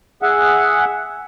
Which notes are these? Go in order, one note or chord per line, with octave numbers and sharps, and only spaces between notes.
G#4 E5 F#5